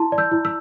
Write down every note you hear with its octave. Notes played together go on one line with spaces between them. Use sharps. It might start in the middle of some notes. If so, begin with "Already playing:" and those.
Already playing: E4 A5 C6
D5
E6 G6
E4
E6